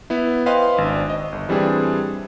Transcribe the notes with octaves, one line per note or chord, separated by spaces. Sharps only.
B3 E4
B4 C5 D#5 F5 G5 C6
G#1 D4
D#5
G1
A2 E3 G3 C4 D4 G#4